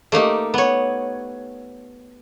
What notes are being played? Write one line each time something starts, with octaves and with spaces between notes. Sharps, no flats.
A3 A#3 D#4 G4
B3 C#5